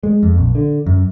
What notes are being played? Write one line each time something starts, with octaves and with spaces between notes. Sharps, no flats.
G#3
F2
A#1
D3
F#2